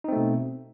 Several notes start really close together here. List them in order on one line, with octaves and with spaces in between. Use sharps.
D#4 C4 A3 B2